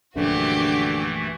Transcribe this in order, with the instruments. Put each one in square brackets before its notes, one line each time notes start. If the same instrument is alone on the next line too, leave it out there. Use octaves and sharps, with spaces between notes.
[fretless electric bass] A#1 F#2 [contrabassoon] D3 [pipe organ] E3 A3 [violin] F#4 G4